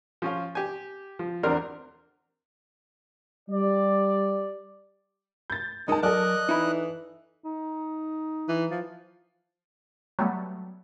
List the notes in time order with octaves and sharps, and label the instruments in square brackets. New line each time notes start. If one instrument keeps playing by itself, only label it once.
[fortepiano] F3 C#4 F4
G4 G#5
F3
E2 C4 D4 A#4 C6 F6
[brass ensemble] G3 D5
[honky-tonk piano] G6 A6
[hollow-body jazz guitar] C2 D#4 [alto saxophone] G#3 [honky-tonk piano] A#4 A5 [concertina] D#5
[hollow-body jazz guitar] F#3 [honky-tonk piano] A4 D5 [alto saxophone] A#4 [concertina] D#5 F#6
[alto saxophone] E3 [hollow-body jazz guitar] D#4 E4 B5
[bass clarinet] D#4
[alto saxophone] E3
F3
[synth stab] F#3 G3 A3 B3